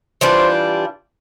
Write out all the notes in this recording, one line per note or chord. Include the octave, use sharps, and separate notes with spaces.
E3 G3 D4 F4 C5